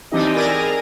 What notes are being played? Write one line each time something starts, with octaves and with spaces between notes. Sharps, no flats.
E3 C4 D4 D#4 G4 D#5
E4 A#4 D5 D#5 G#5 A#6
G#4 A#4